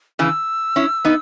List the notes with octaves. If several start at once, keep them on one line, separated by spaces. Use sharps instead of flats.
C#3 E3 E6
C#4 E4
B3 D#4